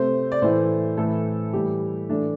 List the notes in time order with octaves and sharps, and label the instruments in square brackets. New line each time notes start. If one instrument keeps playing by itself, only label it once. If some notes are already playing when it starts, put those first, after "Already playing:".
Already playing: [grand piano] C3 A3 C5
D5
A2 E3 A3 C5
A2 E3 A3 A4
A2 E3 G3 G4
A2 E3 A3 D4